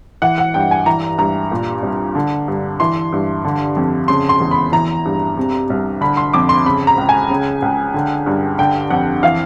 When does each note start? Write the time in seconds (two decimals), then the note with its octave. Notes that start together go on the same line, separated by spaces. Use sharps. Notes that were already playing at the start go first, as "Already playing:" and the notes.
0.22 E3 F#5
0.38 F#5
0.54 G2 G5
0.71 G#5
0.86 E3 A#5
1.18 G2 A#5
1.52 A#2
1.83 C2
2.15 D3
2.48 G2
2.80 E3 C6
3.12 G2
3.44 D3
3.76 F2
4.08 C#3 C6
4.29 C6
4.40 E2
4.51 B5
4.72 E3 A#5
5.05 G2
5.37 C3
5.70 C2
6.01 D3 B5
6.17 C6
6.33 F2 D6
6.49 C6
6.66 C#3 B5
6.87 A#5
6.98 C#2
7.09 G#5
7.30 C#3
7.62 C#2
7.94 D3
8.26 G2
8.58 D3 G5
8.90 F2 F#5
9.23 E3 F5